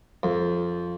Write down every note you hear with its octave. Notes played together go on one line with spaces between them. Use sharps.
F2